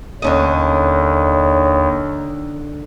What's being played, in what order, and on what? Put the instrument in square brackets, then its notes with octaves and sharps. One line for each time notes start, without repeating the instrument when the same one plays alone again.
[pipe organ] D#2 [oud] D3 C#4 D#5 [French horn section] D#4 C#5